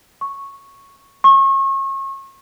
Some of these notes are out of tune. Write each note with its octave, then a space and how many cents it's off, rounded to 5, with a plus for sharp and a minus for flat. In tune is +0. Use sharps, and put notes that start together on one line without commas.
C#6 -5
C#6 -35